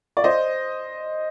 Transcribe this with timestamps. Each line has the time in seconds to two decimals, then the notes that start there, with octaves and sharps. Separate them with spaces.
0.17 D5
0.24 C5 D#5